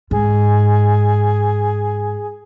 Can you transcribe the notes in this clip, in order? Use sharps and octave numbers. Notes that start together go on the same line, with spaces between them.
G#2 G#4